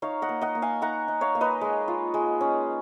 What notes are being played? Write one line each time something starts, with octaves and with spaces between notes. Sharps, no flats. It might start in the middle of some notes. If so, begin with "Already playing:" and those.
D#4 C#5 F5
D#5 F#5
A#3
D#5 F#5
A#3
F5 G#5
D#4 F#5 A#5
D#4
C#5 F5
A#3
B4 D#5
G#3
F4
G#3
C#4